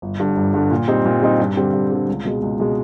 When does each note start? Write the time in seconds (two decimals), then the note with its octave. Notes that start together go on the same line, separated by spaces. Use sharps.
0.02 G1
0.20 G2 D3
0.37 G1
0.54 G2 D3
0.71 A#2
0.88 G3 C4 D#4
1.06 A#2
1.23 G3 C4 D#4
1.39 G2
1.57 D3 G3 C4
1.74 G2
1.91 D3 G3 C4
2.08 C#2
2.25 B2 G#3
2.42 C#2
2.59 B2 G#3